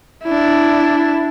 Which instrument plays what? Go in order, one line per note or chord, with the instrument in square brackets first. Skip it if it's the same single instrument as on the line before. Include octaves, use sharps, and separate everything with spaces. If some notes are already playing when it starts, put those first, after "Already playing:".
[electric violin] D4 E4